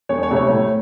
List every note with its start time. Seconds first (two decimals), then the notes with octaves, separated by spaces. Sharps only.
0.09 E1 C#5
0.23 C#5
0.29 D2 C3
0.36 C#5
0.50 A2